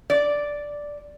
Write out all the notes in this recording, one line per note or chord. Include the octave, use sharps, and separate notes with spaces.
D5